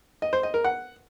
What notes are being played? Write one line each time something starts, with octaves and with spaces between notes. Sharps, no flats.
D#5
C5
D#5
A#4
F#5